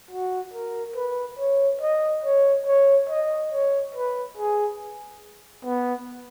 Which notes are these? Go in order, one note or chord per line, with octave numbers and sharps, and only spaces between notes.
F#4
A#4
B4
C#5
D#5
C#5
C#5
D#5
C#5
B4
G#4
B3